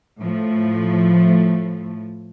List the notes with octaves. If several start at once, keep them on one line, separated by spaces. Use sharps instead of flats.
A2 F3 A3